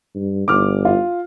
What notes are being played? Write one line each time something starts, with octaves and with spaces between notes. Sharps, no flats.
G2
G1 D6 F6
F4